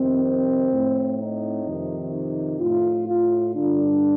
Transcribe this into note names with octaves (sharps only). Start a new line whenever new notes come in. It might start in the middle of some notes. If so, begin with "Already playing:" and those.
Already playing: F2 C3 D#3 C4
A2
D#4
F2 C3 D#3
D#4
A2 F4
F4
G2 D3 D4